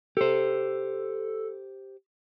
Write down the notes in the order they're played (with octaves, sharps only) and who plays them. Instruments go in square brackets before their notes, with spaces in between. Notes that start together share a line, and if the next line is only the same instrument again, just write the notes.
[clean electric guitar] G4 C5 [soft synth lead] A4